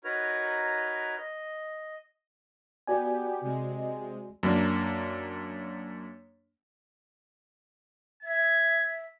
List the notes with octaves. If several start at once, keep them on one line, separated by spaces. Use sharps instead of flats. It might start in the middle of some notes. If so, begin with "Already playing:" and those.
D#4 F#4 A#4 B4 C#5 A#5
D#5
B3 F#4 G4 D5 G#5
C3 G#3
F#2 A#3 D4
E5 G#6